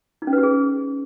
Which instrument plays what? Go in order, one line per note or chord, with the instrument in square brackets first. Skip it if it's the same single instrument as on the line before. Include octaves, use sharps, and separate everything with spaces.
[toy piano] D#4
C#4
B4
G4
G#4